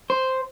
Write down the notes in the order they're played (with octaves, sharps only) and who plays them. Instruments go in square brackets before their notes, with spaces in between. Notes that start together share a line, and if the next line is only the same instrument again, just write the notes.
[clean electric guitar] C5